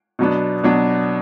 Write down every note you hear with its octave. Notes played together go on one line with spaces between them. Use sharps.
B2 F#3 B3 D4
B2 F#3 B3 D4